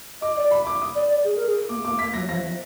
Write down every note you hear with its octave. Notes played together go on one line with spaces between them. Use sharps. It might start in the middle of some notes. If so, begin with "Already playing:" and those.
D#5 D6
D5
B5
D6
D#6
D5
D5
G#4
A#4
G#4
A#3 D6
A#3 D6
A#3 B6
F#3 A#6
F3 A#6
F3